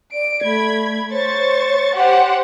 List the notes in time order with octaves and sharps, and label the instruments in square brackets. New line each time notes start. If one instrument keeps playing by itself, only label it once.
[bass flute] D5 [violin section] D7
[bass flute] A3 [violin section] B5 G#6
[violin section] C5 C#6 A6 [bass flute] C#5
[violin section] G4 C5 F#5